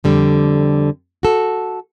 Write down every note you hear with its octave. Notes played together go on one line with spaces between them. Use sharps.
F2 D3 G3
F#4 A4